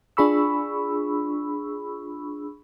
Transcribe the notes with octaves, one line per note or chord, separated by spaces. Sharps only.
D4 F4 G#4 B5 C#6 E6